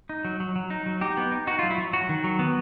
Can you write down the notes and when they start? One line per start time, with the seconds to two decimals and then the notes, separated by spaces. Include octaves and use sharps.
0.09 D#4
0.25 F#3
0.40 F#3
0.56 F#3
0.70 D#4
0.86 F#3
1.01 D#4 G4
1.17 B3
1.32 D#4
1.47 D#4 F#4
1.59 F4
1.63 F#3
1.71 E4
1.78 F#3
1.93 F#3 F#4
2.09 D#3
2.24 F#3
2.39 B3